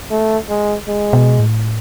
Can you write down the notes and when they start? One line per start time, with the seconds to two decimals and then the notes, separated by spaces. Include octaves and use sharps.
0.11 A3
0.49 G#3
0.88 G#3
1.13 B2
1.39 A2